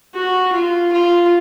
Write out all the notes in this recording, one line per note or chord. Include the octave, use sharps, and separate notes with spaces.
F#4
F4
F4